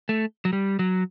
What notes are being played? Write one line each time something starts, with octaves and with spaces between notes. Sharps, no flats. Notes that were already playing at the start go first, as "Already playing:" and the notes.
A3
F#3
G3
F#3